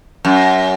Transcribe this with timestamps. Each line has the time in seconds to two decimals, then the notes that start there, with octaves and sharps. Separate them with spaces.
0.25 F#2